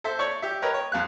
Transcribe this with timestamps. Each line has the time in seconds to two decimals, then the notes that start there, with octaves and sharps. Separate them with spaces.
0.04 A4 C5 E5
0.19 C#5 D5 C#6
0.42 G4 E5
0.62 A#4 B4 C#5 D#5 G5 A#5
0.74 C#5
0.92 F2 F5 F#6